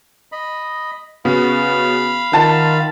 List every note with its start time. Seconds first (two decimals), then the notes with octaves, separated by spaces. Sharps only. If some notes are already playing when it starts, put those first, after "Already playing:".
0.32 D#5 B5
1.25 C#3 B3 F#4 F5 B5
2.33 D#3 F4 F#5 A5